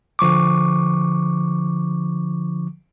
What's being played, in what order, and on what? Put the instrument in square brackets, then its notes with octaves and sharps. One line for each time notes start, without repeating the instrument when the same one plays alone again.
[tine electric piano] D3 F3 C#6 D6